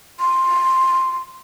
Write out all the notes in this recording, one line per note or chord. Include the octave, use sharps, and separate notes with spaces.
C6